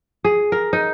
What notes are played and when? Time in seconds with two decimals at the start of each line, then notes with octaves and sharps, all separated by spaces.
0.24 G#4
0.52 A#4
0.73 D#4